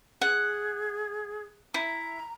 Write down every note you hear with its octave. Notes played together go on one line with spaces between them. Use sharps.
G#4 F#5
E4 A#5